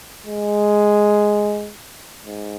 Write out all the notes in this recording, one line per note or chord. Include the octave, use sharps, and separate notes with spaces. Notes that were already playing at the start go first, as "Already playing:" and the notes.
G#3
G#2